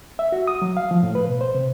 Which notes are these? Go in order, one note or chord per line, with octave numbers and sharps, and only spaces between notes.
E5
F#4
D#6
F#3
F5
F3
A2
B4
B2
C5
C3